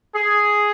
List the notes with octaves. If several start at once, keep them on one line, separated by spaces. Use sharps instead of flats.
G#4